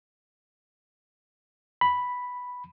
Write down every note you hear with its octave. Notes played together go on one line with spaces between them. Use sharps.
B5